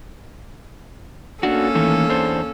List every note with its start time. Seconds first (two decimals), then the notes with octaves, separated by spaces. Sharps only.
1.43 A#3 C#4 D4 F#4 A4
1.75 D#3 E3 A3
2.09 E2 D4 C5